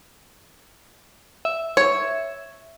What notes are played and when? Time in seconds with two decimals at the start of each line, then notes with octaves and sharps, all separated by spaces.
1.45 E5
1.77 C#5